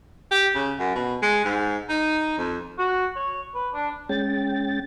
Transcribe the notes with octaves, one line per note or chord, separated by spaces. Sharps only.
G4
C#3
F#2
B2
G#3
G#2
D#4
F2
F#4
C#5
B4
D4
G#3 C#4 G5 A6